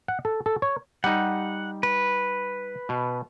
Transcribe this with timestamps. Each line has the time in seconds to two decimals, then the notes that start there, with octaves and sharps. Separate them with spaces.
0.08 F#5
0.25 A4
0.46 A4
0.62 C#5
1.04 G3 D#4 F#5
1.83 B4
2.89 B2